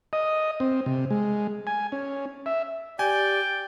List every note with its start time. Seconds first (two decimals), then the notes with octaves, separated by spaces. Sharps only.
0.13 D#5
0.60 C4
0.86 C3
1.10 G#3
1.67 G#5
1.92 C#4
2.46 E5
2.99 G4 D5 G5 G#5